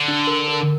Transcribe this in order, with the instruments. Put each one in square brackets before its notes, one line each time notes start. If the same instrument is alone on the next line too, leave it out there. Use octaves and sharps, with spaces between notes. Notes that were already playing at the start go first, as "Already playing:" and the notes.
Already playing: [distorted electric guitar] D3
[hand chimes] D4
A#4
A#4